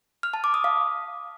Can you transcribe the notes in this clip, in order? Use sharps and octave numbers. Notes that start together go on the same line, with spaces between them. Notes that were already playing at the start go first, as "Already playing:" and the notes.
F6
A5
D6
D#6
F5